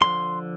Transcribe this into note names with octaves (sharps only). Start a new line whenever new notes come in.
D2 D3 F3 C6